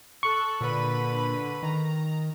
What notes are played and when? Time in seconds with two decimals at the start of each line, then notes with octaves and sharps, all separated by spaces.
0.23 A4 C#6 F#6
0.61 A#2 D3 B4 B5 D#7
1.62 D#3 A#5